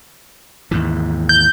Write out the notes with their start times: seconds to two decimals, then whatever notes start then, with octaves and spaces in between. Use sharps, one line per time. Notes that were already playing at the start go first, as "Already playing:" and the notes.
0.71 D#2 G#2 E3
1.29 G6